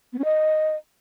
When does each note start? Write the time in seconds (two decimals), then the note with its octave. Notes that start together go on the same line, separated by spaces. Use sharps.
0.13 B3
0.19 C#4
0.24 D#5